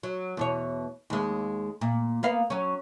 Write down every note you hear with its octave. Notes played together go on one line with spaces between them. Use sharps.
F#3
E2 B2 C#5
D#2 G#3
A#2
A#3 B3 F5
F#3 C#4